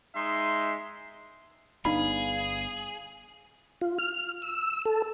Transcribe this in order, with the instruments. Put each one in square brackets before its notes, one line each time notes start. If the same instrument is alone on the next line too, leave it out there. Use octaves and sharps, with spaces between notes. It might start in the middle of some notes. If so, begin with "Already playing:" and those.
[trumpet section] G#3 D#4 E5 C6
[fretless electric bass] G1 B3 D4 [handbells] D#4 B5 [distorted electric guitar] G#4 [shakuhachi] F5
[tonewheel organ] F4
F6
E6
A4